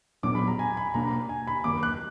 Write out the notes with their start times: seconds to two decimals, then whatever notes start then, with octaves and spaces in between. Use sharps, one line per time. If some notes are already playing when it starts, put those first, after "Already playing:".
0.23 A#2 F#3 B3 D4 D6
0.35 B5
0.48 A#5
0.59 G#5
0.77 B5
0.94 B2 A#3 D4 A#5
1.29 G#5
1.47 B5
1.64 F#2 D#3 A#3 D6
1.83 F#6